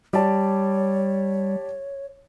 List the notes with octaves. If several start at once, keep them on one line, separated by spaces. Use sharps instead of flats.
G3 G4 C#5 D5 A5